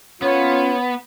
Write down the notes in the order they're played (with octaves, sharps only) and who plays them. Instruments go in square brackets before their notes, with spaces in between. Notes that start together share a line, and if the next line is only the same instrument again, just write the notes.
[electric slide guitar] B3 [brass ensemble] C#4 F4 [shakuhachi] C#5